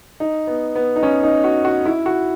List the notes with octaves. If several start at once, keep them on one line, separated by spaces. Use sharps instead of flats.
D#4
B3
B3
D#4
C#4
D#4
F#4
F#4
E4
F#4